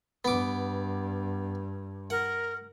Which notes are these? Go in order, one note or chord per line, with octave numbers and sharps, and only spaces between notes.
G2 B3 D6
A#4 F#5